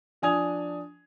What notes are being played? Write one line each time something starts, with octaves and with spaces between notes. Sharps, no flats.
F3 D4 G#5 D#6 G#6 F7